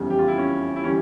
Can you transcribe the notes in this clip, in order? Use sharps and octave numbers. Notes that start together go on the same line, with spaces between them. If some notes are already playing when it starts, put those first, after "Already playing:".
Already playing: F1 E2 C#3 G3
G4
F4
E4
C#4
E4
E3 G3 C#4